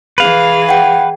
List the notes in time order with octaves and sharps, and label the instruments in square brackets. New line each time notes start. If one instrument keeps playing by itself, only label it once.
[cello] E3 G#4 [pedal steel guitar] B4 F5
[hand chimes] F#5 G5